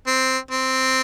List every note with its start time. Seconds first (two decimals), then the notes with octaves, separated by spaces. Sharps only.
0.07 C4
0.51 C4